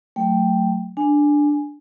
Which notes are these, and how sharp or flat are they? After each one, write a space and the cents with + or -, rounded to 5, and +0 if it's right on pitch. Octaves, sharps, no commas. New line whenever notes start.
F#3 +0 A3 +20 G5 +0
D4 +0 G#5 +0